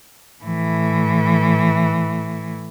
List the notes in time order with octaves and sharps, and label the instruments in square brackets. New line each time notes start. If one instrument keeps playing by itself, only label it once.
[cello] A2 E3